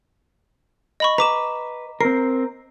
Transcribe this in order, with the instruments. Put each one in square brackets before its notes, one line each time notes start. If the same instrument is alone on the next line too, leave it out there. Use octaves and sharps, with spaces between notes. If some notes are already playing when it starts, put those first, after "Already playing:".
[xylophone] D#5 B5 C#6
[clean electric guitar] B4 [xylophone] A#5 D6 E7
[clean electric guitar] C4 A#4 [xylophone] C7